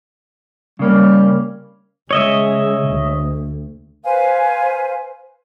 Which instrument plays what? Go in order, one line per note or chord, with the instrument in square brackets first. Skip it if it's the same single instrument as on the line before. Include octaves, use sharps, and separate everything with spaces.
[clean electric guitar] C#3 A#3 C#4 [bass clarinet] G3
[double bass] C#3 G#3 [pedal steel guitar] C#5 D#5 E5
[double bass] D2
[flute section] B4 C5 F5 G#5